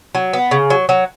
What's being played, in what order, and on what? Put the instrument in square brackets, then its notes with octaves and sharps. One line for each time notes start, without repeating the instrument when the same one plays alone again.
[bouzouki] F#3
B3
C#3
F#3
F#3